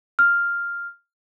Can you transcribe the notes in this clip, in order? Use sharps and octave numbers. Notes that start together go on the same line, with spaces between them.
F6